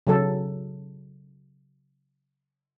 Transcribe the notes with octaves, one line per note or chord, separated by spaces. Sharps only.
C#3 F#3 A4